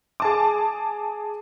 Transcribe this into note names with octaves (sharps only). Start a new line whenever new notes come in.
G#4 A5 D6